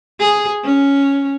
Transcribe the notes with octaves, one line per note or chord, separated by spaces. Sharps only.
G#4
C#4